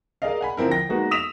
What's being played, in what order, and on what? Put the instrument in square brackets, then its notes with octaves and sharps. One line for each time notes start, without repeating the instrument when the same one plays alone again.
[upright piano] G#4 A#4 D5 D#5 F5
F#5 G#5 B5
D3 F3 C4 E4 A#4
G5 A#6
G#3 A#3 B3 D#4 F#4
D#6 E6 B6 E7 F7